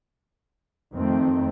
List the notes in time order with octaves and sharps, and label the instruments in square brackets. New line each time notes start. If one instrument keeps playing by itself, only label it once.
[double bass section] F2 D#3 A3 C4